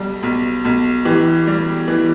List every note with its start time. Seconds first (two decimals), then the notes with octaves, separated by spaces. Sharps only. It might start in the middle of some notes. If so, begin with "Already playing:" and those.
Already playing: B1 G3
0.23 B1
0.65 B1
1.05 E3 G4
1.47 G3
1.88 E3